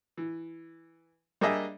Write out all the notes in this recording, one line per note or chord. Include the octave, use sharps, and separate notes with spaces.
E3
G3 A#3 D4 G#4 D#5 E5